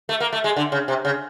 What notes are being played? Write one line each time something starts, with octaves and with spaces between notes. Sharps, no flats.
A3
A#3
A3
G#3
D3
C#3
C3
C#3